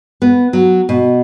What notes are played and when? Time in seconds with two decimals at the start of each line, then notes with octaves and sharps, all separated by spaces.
0.22 B3
0.53 F#3
0.89 B2